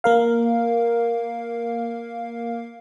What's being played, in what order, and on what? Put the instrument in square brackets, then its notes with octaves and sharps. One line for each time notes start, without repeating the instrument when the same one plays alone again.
[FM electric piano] A#3 A#4 F5